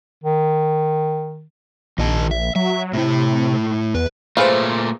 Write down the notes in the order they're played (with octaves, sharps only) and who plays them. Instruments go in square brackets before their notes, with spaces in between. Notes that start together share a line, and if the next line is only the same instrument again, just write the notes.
[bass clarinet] D#3
[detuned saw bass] A#1 [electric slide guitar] D#3 D#5 A5
[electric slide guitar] E5
[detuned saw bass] F#3 [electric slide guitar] E5
[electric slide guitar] A2 E4 [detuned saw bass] C3
[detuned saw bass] E2 [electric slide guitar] B4
[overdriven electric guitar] A#2 A3 [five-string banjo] G#4 B4 F5 [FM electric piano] C5 F6